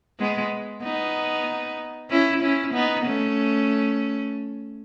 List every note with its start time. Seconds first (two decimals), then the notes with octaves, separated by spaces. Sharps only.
0.20 G#3 B3
0.82 B3 D#4
2.10 C#4 E4
2.42 C#4 E4
2.74 B3 D#4
3.06 A3 C#4